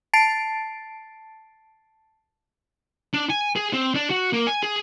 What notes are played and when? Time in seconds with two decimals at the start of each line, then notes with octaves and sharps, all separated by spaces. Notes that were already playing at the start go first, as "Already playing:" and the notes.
0.14 A5 A6 C7 D7
3.13 D4
3.30 G#5
3.56 G#4
3.73 C4
3.95 D4
4.10 F#4
4.33 A#3
4.47 G#5
4.63 G#4